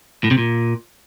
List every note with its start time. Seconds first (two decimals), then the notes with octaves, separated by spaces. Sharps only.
0.24 A2
0.31 C3
0.38 A#2